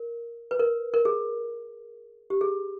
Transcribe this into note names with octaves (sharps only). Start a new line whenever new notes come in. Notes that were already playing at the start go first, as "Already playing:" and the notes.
Already playing: A#4
B4
A#4
A#4
G#4
G4
G#4